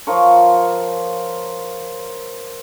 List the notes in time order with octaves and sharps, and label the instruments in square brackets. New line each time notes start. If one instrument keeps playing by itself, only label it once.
[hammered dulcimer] F3 F4 A#4 C#5